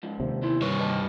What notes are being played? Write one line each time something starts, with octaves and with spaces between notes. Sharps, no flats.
G#2 F3
D#2 C3
E2 E4 C6
G2 B4 C#5
B4 D#5 A5